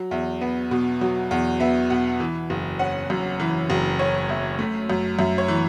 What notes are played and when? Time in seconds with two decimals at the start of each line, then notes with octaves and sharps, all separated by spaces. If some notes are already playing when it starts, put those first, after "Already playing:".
Already playing: F#3
0.11 E2 E5
0.41 B3
0.71 B2
1.01 F#3
1.31 E2
1.60 B3 E5
1.90 B2 F#5
2.20 E3
2.50 F#1
2.79 C#4 F#5
3.10 F#2
3.40 E3
3.70 F#1
3.99 C#4 C#5
4.29 F#2 E5
4.59 A3
4.90 F#2
5.19 F#2 E5
5.38 C#5
5.48 E3